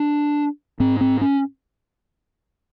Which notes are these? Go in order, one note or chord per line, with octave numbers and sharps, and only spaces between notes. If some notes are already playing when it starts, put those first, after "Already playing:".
Already playing: D4
G#2 C4
C4
C#4